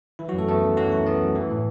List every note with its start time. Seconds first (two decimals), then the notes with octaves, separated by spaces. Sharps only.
0.19 E3 E4
0.28 F#3 F#4
0.34 F#2 A3 A4
0.49 A3 B3 A4
0.63 F#2
0.77 E3 F#3 F#4
0.92 F#2 E4
1.07 B3
1.21 F#2
1.35 E3
1.50 A2